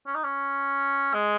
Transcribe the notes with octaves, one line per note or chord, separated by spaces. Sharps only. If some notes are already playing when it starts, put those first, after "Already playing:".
C#4
D#4
C#4
G#3